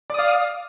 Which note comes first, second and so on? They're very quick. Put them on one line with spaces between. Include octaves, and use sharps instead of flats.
D5 D#6 F5